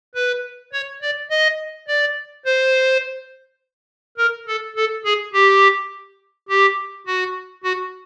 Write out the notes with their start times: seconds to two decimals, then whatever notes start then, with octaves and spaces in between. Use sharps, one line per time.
0.15 B4
0.73 C#5
1.02 D5
1.30 D#5
1.88 D5
2.46 C5
4.18 A#4
4.47 A4
4.76 A4
5.05 G#4
5.33 G4
6.49 G4
7.06 F#4
7.64 F#4